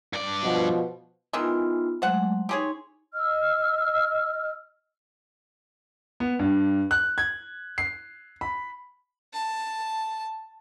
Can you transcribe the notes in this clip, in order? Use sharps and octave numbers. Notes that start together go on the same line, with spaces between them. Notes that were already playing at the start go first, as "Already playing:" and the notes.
G2 D5
B2 F3
D#3 E3 G#3 B3 D#4 F4
F#3 G#3 A3 C5 F#5
D#4 G4 G#4 C#5 C6
D#5 E6 F6
B3
G2
F#6
G#6
C7
B5
A5